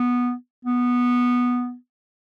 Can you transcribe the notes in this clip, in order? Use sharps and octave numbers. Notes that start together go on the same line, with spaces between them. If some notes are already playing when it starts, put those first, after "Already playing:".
Already playing: B3
B3